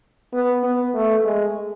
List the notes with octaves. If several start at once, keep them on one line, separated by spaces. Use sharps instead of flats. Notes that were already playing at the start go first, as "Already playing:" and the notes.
B3
B3
A3
G#3